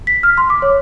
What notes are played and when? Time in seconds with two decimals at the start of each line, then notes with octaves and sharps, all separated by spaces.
0.07 B6
0.23 F6
0.37 C6
0.50 D6
0.62 C#5